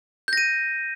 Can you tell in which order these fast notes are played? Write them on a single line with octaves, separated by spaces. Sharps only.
G6 A#6 D#7